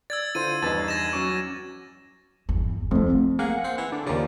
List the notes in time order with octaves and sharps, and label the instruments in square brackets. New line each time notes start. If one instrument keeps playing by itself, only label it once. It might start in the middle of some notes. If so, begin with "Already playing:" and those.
[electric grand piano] D5 [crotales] E6 G#6 A6
[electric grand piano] D3 [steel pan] E4 F4 C5 [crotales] D#7
[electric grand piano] E2 G2 [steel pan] D#4 B4 A5 [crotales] A6
[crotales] G#6 A#6 E7
[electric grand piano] F#3 C#4 C#6 [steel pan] D6
[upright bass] G1 E2
[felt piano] F2 [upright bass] A3 E4
[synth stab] A#3 [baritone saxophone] G#4 [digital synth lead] F#5
[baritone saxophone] C4
E3
[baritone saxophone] D3 [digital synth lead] D4
[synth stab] D#2 C#3 [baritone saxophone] F3 [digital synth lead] D5